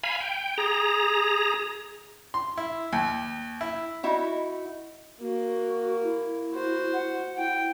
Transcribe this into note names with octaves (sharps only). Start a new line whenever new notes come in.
F5 G#5 B5
G5
G#4 A#5
C6
E4
D#2
E4
D#4 E4 F#4
A#3 F#4
E4
F#4 C5
F#5
E4 G5